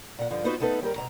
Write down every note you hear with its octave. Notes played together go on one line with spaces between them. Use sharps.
A#2 F#5
G2 D3 F3
B3 D#4 F4 F#4 B4 C5
A3 B3 D#4 A4 B4
D#2 G3 G4 A#4
B2 F#3 A#5